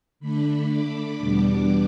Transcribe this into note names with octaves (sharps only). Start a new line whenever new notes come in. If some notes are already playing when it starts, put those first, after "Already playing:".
D3 A3 D4 B5
D6
E2 B2 G3 B3 D4